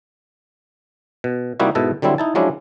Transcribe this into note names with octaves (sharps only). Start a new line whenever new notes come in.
B2
C3 G3 A#3 D#4 E4 F#4
G#2 B2 E4 A4 A5
D3 F#3 G3 C4 E4
D#4 E4 A5
F3 F#3 G#3 C#4 D4 E4